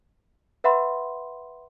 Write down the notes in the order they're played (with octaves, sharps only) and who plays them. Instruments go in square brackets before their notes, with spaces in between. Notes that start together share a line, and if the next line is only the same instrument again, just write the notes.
[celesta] B4 E5 F#5 B5 C6